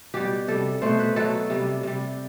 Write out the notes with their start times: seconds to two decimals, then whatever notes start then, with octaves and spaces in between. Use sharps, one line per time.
0.14 B2 G3 G4
0.48 C3 G3 A4
0.82 B2 A3 C5
0.99 B4
1.16 B2 F#3 A3 A4
1.50 C3 G3
1.83 C3 G3